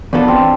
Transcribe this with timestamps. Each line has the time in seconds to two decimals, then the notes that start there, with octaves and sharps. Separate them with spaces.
0.13 E2 B2 B3 D4 F4 A4
0.28 C4